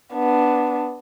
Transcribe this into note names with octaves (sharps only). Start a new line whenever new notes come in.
B3 D4